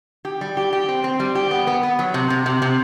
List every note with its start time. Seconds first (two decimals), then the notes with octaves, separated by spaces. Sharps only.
0.25 G4
0.41 G3
0.57 G4
0.73 G4
0.89 C4
1.04 C4
1.20 G3
1.35 G4
1.51 B3
1.67 B3
1.83 B3
1.99 F#3
2.14 C3
2.30 C3
2.46 C3
2.62 C3